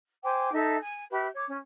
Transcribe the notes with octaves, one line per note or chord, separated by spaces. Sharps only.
C5 G5 G#5 D6
D#4 A4 E5
G#5
G4 B4 E5
C#5 D6
C#4